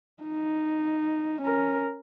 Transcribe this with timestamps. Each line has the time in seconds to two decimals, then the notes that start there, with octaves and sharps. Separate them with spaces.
0.23 D#4
1.41 C#4 A#4